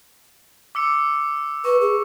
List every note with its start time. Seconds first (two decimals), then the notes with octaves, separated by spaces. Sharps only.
0.75 D6 E6 C#7
1.65 B4 C#6
1.81 G#4